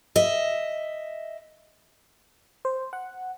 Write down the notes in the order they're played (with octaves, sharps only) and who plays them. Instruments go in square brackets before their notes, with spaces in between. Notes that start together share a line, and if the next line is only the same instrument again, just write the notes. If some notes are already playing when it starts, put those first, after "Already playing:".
[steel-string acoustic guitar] D#5 E5
[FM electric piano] C5
F#5